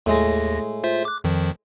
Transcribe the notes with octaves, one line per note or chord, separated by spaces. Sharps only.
D#2 A2 G#3 A#6
F4 C5 E5
D6 F#6
F2 D#3 F3